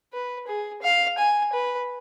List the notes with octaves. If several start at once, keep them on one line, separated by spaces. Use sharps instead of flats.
B4
G#4
F5
G#5
B4